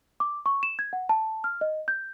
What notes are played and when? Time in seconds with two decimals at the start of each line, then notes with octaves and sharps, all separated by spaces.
0.20 D6
0.46 C#6
0.63 E7
0.79 G#6
0.93 F#5
1.09 A5
1.44 F6
1.61 D#5
1.88 G6